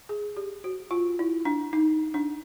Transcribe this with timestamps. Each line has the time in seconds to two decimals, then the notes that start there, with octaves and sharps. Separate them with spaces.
0.09 G#4
0.37 G4
0.64 F#4
0.91 F4
1.19 E4
1.45 D4
1.73 D#4
2.14 D4